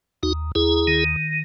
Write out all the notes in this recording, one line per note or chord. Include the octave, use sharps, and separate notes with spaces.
D#2 D#4 F#4
D#2 E4 G#4
D#3